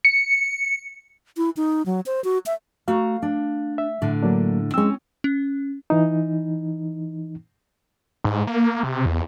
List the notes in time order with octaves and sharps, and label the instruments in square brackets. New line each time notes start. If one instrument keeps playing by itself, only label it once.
[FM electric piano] C#7
[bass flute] E4
D#4
F#3
C5
F#4
E5
[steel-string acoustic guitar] A3 F#4 A#5 [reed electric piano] F5
[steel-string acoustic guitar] D4
[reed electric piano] E5
[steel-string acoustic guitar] A2 D3
[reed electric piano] F#3 A#3 D4
[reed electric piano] G#3 E6 [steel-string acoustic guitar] C4 C#4
[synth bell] C#4
[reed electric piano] E3 D#4
[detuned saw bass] G#2
A#3
C3
E2